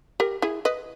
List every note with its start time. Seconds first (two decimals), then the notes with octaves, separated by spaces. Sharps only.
0.20 G4 A#4
0.42 E4 G#4
0.65 B4 D#5